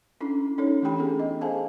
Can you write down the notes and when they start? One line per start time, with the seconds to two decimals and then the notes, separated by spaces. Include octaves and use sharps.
0.21 C#4 D4 E4 A4
0.58 C#4 D#4 A4 C#5
0.82 E3 A3 D4 G4 G5 B5
0.98 B3 C#4 D4 E4 G#4 A4
1.19 D#5
1.41 G#4 A4 C5 F5 G#5 A5